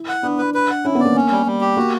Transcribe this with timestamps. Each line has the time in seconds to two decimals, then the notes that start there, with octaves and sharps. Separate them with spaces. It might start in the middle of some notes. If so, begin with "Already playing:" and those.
Already playing: E4
0.09 F#5
0.23 B3 D4
0.38 B4
0.54 B4
0.70 F#5
0.85 C#4 E4
0.95 B3
1.00 A#3 D5
1.15 C#4
1.31 G3
1.46 G3
1.61 G4
1.77 A#3 F#4